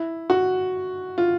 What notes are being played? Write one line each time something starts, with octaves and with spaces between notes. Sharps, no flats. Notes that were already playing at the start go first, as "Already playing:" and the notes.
Already playing: E4
F#4
F4